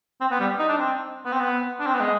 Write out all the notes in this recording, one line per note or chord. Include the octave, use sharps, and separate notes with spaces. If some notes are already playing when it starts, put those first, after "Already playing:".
C4
B3
G3
D#4
D4
C4
B3
C4
B3
D4
C4
B3
G#3